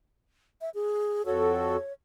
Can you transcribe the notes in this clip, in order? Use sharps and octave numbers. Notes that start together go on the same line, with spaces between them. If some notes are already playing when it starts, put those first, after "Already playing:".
E5
G#4
F2 F#4 A4 C#5